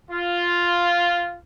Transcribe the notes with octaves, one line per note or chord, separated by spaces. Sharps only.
F4